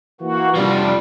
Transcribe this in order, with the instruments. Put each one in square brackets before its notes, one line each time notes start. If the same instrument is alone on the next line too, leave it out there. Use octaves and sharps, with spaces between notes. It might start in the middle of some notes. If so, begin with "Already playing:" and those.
[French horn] E3 [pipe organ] A#3 F#4
[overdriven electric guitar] C3 F3 [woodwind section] G3 [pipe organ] D4 [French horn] G4